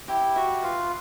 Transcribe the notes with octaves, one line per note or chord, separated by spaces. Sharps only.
E4 G4
F#4 E5
F4 B4